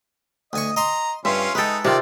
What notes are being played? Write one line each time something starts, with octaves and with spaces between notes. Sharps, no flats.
D2 D#5 G#5 C#6
D#5 A#5 C6
G2 C#4 F4 E5 C6
G#3 D#4 A4 B4 G5
C3 D#3 F4 D5